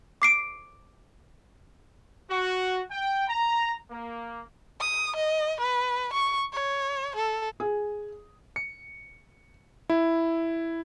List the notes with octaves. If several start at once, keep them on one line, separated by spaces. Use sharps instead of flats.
D6 C7 D7
F#4
G5
A#5
A#3
D#6
D#5
B4
C#6
C#5
A4
G#4
C#7
E4